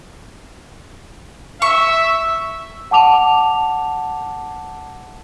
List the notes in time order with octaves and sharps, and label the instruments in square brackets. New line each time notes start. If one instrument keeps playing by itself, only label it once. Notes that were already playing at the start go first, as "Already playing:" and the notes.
[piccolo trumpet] E5 [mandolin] C#6
[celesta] F#5 A5 D6 F7